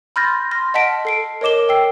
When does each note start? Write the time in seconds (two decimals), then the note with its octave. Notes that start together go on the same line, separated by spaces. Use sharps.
0.16 B5 C6 F6 G6 A6 A#6
0.51 C6 F6 A#6
0.74 D#5 F#5 A5 B6 D7
1.05 A4 C7 D7
1.41 A#4 C#5 D#5 D6 E7 G7
1.69 G5 E6 C7